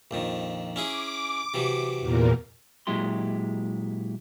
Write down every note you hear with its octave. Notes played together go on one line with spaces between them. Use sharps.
A#1 F2 D#3
C#4 E4 G#4 D6
C3 E3 F#3
E2 A#2 A#3
A#2 F#3 G#3 E4 G4 C6